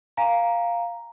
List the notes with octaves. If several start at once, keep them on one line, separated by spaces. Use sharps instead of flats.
F5 G#5 A#5